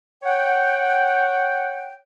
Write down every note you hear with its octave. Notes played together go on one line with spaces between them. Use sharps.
C#5 F#5 G5